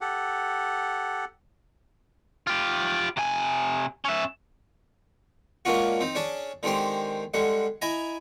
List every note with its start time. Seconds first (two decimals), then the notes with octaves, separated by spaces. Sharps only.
0.01 G4 A4 F#5
2.47 F4 G4
3.17 C3 G#5
4.05 C#4 E5
5.65 G#3 A#3 C#4 D4 F4 F#4
6.00 C4 D#4
6.15 C#4 D4 G#4 A5
6.63 D3 D#3 G#3 C4 G4 C5
7.34 D3 G3 G#3 F#5
7.82 E4 D#5 G#5 A#5